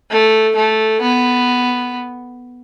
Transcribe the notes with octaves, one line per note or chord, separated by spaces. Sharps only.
A3
A3
B3